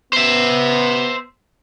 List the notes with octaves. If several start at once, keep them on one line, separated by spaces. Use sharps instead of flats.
B3 C5 E5